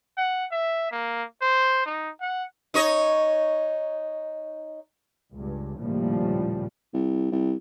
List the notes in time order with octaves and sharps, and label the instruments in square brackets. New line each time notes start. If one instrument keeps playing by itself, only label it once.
[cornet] F#5
E5
A#3
C5
D#4
F#5
[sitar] D#4 C#5 D#5
[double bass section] C#2 G2
A#1 D#2 A2 C#3 F3 G3
[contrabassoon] C2
C2